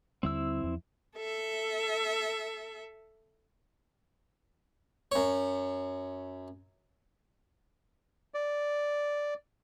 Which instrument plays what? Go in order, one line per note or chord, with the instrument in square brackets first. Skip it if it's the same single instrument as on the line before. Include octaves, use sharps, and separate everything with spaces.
[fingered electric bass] D#2 D3 G3 [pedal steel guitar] C4 E4 E6
[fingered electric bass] E2 F3
[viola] A4 E5
[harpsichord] F#2 C#5
[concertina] D5